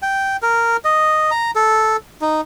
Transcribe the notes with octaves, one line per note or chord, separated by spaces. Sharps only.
G5
A#4
D#5
A#5
A4
D#4